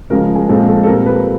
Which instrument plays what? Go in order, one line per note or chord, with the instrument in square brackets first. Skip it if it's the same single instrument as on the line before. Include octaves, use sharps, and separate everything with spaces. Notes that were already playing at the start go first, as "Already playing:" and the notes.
[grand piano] C#3 F3 G#3 A#4
G#4
A#2 F3 G#3 C4 A4
A4
A4
A#2 G3 C4 A#4
B4